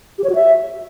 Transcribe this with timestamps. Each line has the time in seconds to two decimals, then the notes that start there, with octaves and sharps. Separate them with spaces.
0.18 G4
0.24 C#5
0.30 F#4
0.35 E5